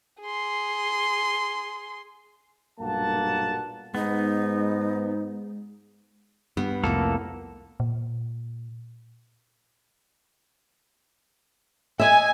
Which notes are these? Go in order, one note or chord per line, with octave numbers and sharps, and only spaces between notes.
G#4 C6
B1 G2 A#2 A#3 F#5 A5
G#2 G#3 B3 D#4
G2 B3
C2 F2 A2 A#3 A4
A#2
D#5 E5 G#5